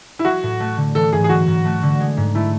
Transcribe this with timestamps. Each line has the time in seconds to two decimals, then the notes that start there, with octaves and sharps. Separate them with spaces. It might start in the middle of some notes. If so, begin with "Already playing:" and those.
0.19 E4
0.25 F#3 F#4
0.43 A2
0.60 A3
0.77 D3
0.95 E3 A4
1.13 G#2 G#4
1.24 G#4
1.29 F#3 F#4
1.47 G#2
1.65 A3
1.82 D3
2.00 G#3
2.17 G#2
2.35 A3 E4